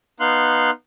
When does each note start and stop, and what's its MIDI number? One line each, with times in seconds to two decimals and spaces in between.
0.20 0.70 59
0.20 0.70 63
0.20 0.70 77
0.20 0.70 84
0.20 0.70 90